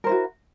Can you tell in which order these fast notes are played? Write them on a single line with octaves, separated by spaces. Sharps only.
A#4 C5 E4 F#4